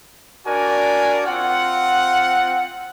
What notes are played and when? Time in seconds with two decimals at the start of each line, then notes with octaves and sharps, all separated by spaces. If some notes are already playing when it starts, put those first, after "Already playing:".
0.46 D4 F#4 A#4 D5 G#5
1.27 C4 F4 F#5